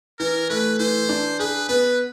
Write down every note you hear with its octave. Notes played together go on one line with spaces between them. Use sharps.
E3 A#4
A3 B4
E3 C5
D4
G#4 B4
B3 B4